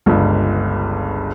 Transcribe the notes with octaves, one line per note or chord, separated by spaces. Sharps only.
G1 C#2 G2